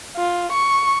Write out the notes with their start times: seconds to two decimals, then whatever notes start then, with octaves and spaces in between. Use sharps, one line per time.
0.17 F4
0.52 C#6